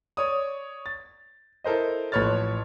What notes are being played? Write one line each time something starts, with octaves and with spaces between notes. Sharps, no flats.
C#5 D5 D#6
A6
E4 A4 A#4 C5 D#5
A1 F3 B4 C#5 F6 A6